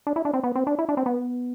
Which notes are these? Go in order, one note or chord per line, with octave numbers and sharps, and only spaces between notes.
D4
E4
D4
C4
B3
C4
D4
E4
D4
C4
B3